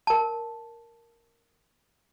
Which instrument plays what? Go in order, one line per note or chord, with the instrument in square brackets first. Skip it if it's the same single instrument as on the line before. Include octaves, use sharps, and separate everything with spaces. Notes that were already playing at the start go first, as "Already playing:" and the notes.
[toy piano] A#4 A5